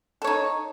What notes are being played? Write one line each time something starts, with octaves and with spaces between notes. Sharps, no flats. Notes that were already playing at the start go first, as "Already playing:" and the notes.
D#4 A4 C#5